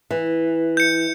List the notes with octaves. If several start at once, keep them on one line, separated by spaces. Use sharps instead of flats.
E3
G6 C#7